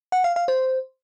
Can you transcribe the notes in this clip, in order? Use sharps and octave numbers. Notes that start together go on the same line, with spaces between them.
F#5
F5
F5
C5